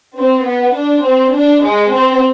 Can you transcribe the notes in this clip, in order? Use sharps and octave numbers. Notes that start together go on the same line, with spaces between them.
C4
B3
D4
C4
D4
G#3
C4